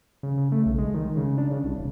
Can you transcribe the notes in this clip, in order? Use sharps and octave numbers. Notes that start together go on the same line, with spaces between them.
C#3
C#3
A3
B1
G#3
D#3
C#3
D4
C#3
C2
E1